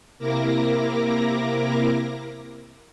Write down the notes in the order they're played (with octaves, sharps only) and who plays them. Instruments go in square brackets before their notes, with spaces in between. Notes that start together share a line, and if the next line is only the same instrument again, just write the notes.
[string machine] C3 A#3 E4 A#4 D6 A#6